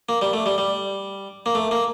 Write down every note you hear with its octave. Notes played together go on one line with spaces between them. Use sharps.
A#3
G3
A3
G3
G3
A#3
A3
A#3